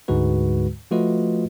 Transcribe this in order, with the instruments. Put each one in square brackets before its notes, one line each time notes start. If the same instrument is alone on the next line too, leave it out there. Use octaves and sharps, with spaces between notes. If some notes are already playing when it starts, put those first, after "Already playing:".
[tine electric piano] D2 G#2 D3 G#3 F#4 B4
F3 A3 F4 F#4 B4 D#5